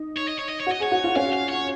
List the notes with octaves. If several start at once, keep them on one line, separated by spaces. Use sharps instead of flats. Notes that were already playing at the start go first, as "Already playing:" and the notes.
Already playing: D#4
C#5
D#5
C#5
D#5
C#5
F#4
D#5
G#4 C#5
F#4
F4
C#4 F5
F5
C#5